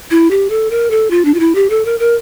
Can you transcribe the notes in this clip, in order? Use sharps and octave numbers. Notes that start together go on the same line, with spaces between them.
E4
G4
A4
A#4
A4
F4
D4
F4
E4
G4
A4
A#4
A#4